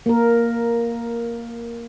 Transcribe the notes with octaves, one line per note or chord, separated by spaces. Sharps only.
A#3 A#4